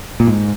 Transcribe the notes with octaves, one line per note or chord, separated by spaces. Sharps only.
A#2
G#2